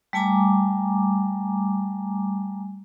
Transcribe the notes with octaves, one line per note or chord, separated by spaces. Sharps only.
G3 A3 G#5 A#5 D6